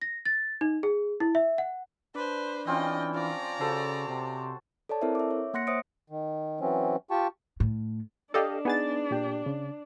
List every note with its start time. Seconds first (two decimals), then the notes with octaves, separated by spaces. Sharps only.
0.02 A#6
0.25 A6
0.61 D#4
0.83 G#4
1.20 E4
1.35 E5
1.58 F#5
2.15 D4 B4 C5
2.67 E3 C4 C#4 F4 D#5 G5
3.14 F3 D5 A#5
3.60 C#3 F#4 A4 C5 A5
4.08 C3
4.89 A4 C#5 D5 A5
5.02 C4 E4 A4 A#4 C5 E5
5.15 E5 D6
5.31 C#5
5.54 A#3 F#5 C6 F#6 A#6 C#7
5.67 C5 C#5 E5 D#6 C#7 D7
6.10 D#3
6.61 E3 F#3 C4 C#4
7.11 F4 G4 G5 A5 C#6
7.60 A2
8.34 D4 G4 A4 D5 D#5 F5
8.65 B3 D#4 G#4 B4 A6
9.11 A#2 G4
9.46 C#3